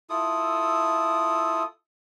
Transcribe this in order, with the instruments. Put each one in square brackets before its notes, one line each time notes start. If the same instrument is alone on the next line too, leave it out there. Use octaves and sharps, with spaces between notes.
[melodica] E4 F4 A4 D#6